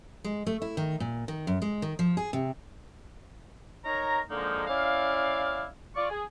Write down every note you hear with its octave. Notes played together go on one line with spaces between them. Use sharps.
G#3
A3
E4
D#3
A#2
D#3
F#2
G#3
D#3
F3
G#4
C3
D#4 A#4 C#5 A#5
D3 F3 G#3 A#3 D#4
C#4 E4 D5 F5
F4 D5 C#6
G#4